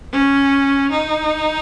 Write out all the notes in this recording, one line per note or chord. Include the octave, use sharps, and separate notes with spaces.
C#4
D#4